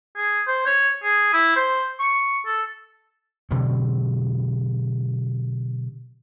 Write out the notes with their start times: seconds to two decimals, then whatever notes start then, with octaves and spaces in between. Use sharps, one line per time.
0.17 G#4
0.47 C5
0.66 C#5
1.04 G#4
1.33 E4
1.56 C5
2.00 C#6
2.46 A4
3.51 B2 D3 F#3 C4